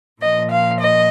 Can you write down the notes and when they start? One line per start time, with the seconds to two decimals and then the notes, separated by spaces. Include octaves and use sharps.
0.21 A#2 F3 D#5
0.50 F5
0.80 D#5